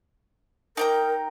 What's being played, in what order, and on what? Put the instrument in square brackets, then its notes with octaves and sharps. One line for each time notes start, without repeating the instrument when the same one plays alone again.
[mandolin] D#4 G5 A#5 [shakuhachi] A#4